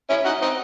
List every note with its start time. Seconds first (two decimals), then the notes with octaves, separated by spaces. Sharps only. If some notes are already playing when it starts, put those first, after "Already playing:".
0.10 C#4 E4
0.25 D#4 F#4
0.42 C4 D#4